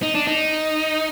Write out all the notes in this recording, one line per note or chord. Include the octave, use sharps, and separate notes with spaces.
D#4
D4
D#4